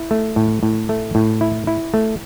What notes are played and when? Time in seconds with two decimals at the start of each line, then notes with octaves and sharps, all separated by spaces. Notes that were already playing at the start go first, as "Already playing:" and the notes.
Already playing: E4
0.11 A3
0.36 A2
0.63 A2
0.89 A3
1.15 A2
1.41 E4
1.67 E4
1.94 A3